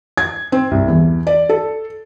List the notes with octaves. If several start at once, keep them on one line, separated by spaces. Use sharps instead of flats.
G#6
C4
C2
E2
D5
A4